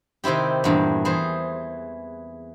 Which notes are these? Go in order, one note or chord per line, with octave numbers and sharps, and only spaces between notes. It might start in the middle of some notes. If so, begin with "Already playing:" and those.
C3 D#3 C4 E4 G4
E2 G2 A#2
E3 G#4 C5